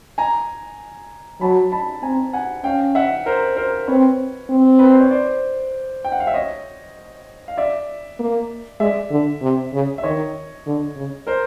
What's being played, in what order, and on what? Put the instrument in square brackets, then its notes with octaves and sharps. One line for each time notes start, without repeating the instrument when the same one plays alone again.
[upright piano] G#5 A#5
[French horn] F#3 [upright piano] A5 B5
[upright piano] A5 B5
[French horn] C4 [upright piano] G#5 A#5
[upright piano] F#5 G#5
[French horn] C#4 [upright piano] F5 G5
[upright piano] E5 F#5
A#4 C5
A#4 C5
[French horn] C4 [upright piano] B4 C#5
[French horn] C4
[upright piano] B4
C5
C#5
C5 D5
G5
F#5
F5
E5
C#5 D#5
F5
D5 E5
[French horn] A#3
[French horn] G#3 [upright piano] D5 E5
[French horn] D3
C3
C#3
[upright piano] E5
[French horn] D#3 [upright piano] C#5 D#5
[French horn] D3
C#3
[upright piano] A#4 C5